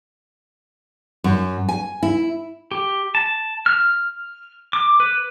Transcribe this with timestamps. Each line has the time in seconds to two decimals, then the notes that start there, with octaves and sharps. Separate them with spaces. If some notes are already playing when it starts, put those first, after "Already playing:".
1.24 F#2
1.69 G#5
2.03 E4
2.71 G4
3.15 A5
3.66 F6
4.73 D6
5.00 B4